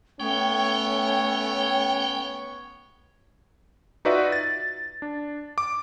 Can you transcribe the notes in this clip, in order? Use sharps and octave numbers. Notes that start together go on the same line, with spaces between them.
A3 B3 C#4 C#5 G5
D#4 F4 F#4 B4 D5 E5
A6
D4
D6